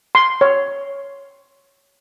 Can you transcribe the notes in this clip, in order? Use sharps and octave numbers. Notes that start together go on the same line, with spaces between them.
C6
C#5